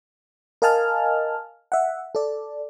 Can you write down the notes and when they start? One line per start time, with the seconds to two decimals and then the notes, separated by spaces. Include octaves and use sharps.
0.62 A#4 D#5 F5 G#5 A5 F6
1.72 E5 F#5
2.15 A4 D5